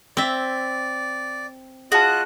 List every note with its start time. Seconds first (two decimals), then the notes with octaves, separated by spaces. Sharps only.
0.17 C4 D5 E5
1.92 F4 F#4 G#4 D#5 A5 F#6